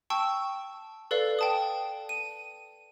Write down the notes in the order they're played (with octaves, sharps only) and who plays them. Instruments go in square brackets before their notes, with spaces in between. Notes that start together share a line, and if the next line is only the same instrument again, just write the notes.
[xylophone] G5 A5 C#6 E6
A4 B4 D5 F5
G5 A5 D#6
D#7